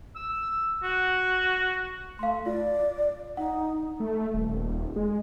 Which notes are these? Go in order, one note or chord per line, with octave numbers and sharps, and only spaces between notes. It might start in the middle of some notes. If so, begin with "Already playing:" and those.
E6
F#4
A3 F5 C6
F4 D5
D#4 F#5
A3
D#1
G#3